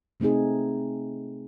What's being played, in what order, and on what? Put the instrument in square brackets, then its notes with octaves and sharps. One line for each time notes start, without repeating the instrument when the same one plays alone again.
[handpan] C3 A3 C4 D#4 G#4